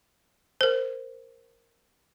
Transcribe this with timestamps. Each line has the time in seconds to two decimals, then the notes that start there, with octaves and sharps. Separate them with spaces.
0.61 A#4 C5